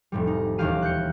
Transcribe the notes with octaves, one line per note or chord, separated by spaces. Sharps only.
F1 A2 G3
D#4
E1 D#2 E3 G4 F5 D#7
F#6 G6 C#7